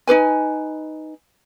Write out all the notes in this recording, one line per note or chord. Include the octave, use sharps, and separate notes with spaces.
D#4 G#4 B4 G#5